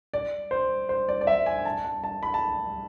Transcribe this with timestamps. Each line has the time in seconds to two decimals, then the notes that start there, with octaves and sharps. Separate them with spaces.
0.14 D5
0.51 C5
0.89 C5
1.09 D5
1.21 D5
1.27 E5
1.46 G#5
1.65 A5
1.85 A5
2.04 A5
2.23 B5
2.34 A5